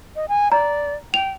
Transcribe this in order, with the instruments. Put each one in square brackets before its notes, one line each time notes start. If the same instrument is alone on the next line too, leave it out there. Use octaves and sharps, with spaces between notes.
[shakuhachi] D#5
G#5
[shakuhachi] D5 [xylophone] A#5
[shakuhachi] G5 [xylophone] F7